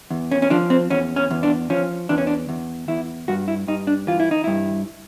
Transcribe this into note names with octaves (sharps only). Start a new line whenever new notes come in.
E2
C#4
C#4
F3 D4
C4
E2 C#4
C#4
E2
D4
F3 C#4
E2 D4
C#4
D4
E2
E2 E4
G2 F#4
E4
G2 D#4
D4
E3 F4
E4
D#4
G2 E4